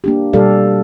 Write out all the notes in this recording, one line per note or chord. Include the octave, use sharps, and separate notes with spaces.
A#3 D4 G4
B2 G3 G4 A4 D5 F5